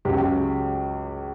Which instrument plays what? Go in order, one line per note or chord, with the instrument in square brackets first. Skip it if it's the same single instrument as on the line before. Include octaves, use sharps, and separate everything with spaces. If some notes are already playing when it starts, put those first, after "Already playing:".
[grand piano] C#2 C#3 F#3 G4